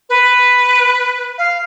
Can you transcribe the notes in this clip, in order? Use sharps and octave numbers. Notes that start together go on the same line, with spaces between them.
B4
F5